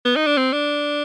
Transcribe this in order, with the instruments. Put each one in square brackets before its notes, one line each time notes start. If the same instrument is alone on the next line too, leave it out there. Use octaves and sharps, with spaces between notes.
[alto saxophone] B3
D#4
D4
C4
D4